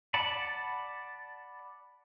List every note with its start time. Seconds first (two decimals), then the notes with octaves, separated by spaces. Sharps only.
0.14 D5 F#5 A5 B5